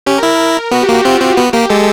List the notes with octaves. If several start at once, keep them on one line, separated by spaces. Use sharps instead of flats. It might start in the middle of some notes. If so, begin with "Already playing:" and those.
C#4 G4
A#4
E4
B3 F#4
G4
A#3 F#4
C4 F4
C4 F#4
B3 F#4
A#3 G4
G#3 A4